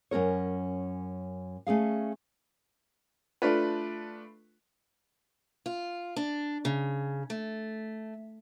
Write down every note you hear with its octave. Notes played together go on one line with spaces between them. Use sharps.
F#2 C#4 A#4 C#5
A3 C#4 G#4 F5
A3 D4 F4 B4
F4
D4
C#3
A3